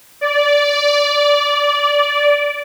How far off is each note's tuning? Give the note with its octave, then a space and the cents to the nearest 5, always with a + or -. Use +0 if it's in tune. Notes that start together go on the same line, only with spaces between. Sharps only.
D5 -15